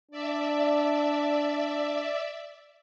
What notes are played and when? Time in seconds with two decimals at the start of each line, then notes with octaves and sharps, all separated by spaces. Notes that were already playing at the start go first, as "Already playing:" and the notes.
0.11 D4 D5 E5